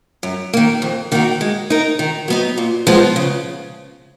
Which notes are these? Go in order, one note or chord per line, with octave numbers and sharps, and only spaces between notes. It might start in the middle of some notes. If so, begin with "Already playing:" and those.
F#2
D#3 A#3
F2
D#3 A#3 D#4 F#4
G#3
D#4 A#4
D#3
F#3 B3 D#4
A#2
F3 G#3 B3 F4
C#3